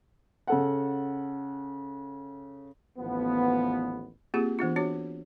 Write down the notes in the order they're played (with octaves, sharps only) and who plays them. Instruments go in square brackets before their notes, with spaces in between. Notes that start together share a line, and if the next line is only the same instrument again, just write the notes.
[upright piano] C#3 A4 F#5
[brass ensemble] A1 D#2 F3 B3
[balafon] A#3 C4 F4 G4 G#4
E3 B3 D4 F4
D4 F#4 C#5